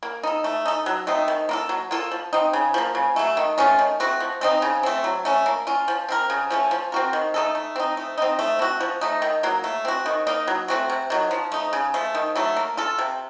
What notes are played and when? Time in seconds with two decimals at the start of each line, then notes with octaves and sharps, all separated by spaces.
0.03 A#3
0.23 D#4 A4
0.44 A3
0.66 D#4 A4
0.86 F#3
1.07 A3 C4 D#4
1.28 D#3
1.49 A#3 F4 A4
1.69 F#3
1.91 A#3 F4 A4
2.11 F3
2.33 C4 D#4
2.53 C#3
2.74 F3 A#3
2.95 C#3
3.16 F#3 A3
3.37 D#3
3.58 A3 C#4 F4
3.79 D#3
4.00 A3 C4 F#4
4.20 F3
4.41 A3 C4 D#4
4.62 C#3
4.83 A3 C4
5.04 F#3
5.25 A3 C#4
5.46 A#3
5.67 C#4 F4
5.88 F3
6.09 C4 F4 A#4
6.30 C#3
6.50 F3 A3 C#4
6.71 F3
6.92 C4 F#4 A#4
7.13 D#3
7.34 A3 D#4 A4
7.55 A3
7.76 C4 D#4
7.97 A3
8.18 C4 D#4
8.39 A3
8.59 C4 F#4
8.80 F3
9.01 A3 D#4
9.22 D#3
9.43 F#3 A#3
9.64 A3
9.85 C4 F#4
10.06 D#3
10.27 A#3 D#4
10.48 F#3
10.68 A3 C4 F#4
10.90 C3
11.10 D#3 F#3
11.31 F3
11.52 A3 D#4
11.73 C#3
11.94 F3 A3
12.15 D#3
12.36 F#3 A3
12.56 A#3
12.77 F4 A4
12.99 C3